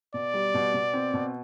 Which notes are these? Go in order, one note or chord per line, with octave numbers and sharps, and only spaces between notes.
B2 D5
G3
B2
B2
C4
B2